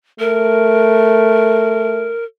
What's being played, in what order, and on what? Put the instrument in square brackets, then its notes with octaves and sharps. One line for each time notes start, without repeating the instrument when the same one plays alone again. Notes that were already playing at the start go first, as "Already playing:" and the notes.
[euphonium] A3 [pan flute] A#4